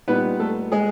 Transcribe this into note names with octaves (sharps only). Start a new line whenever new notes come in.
A#2 G3 B3 D#4 B4
A3 A4
G#3 G#4